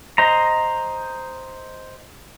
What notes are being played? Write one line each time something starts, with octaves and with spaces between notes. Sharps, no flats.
C5 D#5 A#5